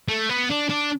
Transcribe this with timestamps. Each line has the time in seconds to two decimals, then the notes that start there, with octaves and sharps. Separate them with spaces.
0.09 A3
0.29 B3
0.50 D4
0.69 D4